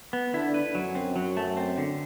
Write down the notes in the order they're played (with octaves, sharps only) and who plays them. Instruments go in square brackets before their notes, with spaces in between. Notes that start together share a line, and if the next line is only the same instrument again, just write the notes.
[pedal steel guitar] B3
[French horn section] D3 [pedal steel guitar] E4
[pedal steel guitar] B4
[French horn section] F#2 [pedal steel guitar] F#3
[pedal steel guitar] C4
F#3
A3
C4
D3